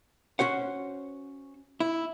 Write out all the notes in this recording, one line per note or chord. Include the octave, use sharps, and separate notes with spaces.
C#4 F#4 C5 F#5
E4